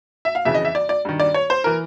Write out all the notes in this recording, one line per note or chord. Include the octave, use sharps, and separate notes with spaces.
E5
F5
F2 C#3 E3 E5
D#5
E5
D5
D5
G2 D#3
D5
C#5
C5
E3 A#4